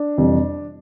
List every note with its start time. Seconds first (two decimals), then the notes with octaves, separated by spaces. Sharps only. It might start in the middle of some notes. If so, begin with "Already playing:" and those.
Already playing: D4
0.18 F2 C3 E3 G3